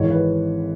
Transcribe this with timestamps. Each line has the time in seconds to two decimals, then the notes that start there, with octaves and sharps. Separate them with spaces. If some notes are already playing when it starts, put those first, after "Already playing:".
Already playing: G#1 G#2 E3 C#5
0.11 B4